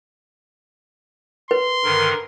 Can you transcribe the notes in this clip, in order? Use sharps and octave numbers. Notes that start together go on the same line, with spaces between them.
B4 C6
G2 D3 D#3 A#4